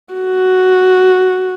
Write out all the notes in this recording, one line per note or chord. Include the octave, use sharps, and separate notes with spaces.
F#4